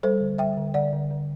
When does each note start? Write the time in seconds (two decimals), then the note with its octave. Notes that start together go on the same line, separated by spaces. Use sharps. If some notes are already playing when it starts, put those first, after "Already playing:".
0.03 G3 A4 C5
0.20 D3
0.38 G3 E5 G5
0.57 D3
0.74 D3 D5 F#5
0.93 D3
1.11 D3